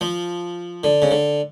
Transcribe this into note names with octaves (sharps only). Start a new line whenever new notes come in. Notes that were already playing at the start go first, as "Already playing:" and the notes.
F3
D3
C#3
D3